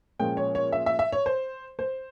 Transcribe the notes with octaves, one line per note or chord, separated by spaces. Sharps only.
A#2 F3 G#3 C#4 G5
C#5
C#5
E5
E5
E5
C#5
C5
C5